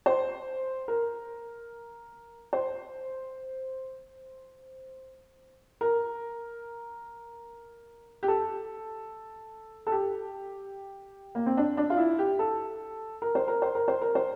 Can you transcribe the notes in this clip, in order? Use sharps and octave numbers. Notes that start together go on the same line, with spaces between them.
C5
A#4
C5
A#4
G4
A4
A4
G4
A#3
C4
D4
D4
F4
E4
G4
A4
A#4
C5
A#4
C5
A#4
C5
A#4
C5